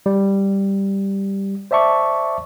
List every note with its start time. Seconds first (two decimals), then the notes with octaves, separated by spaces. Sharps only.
0.06 G3
1.71 C5 D5 E5 A5 C#6 D6